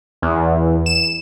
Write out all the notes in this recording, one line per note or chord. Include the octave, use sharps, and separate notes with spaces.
E2
E7